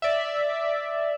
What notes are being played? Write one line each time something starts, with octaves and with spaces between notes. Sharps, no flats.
D5 E5